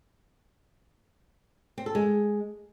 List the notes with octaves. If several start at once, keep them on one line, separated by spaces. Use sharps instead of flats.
C4
A4
G#3